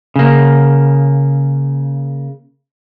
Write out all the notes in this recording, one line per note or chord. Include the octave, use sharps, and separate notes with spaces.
C#3 A#3